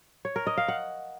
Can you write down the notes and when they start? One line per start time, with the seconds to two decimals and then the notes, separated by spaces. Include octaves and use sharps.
0.25 C#5
0.36 A#4
0.47 D#5
0.57 F5
0.68 F#5